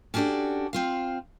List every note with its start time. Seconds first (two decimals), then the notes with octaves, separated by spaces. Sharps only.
0.14 C#4 D4 F#4 G4 A4 D5
0.73 C4 F4 F5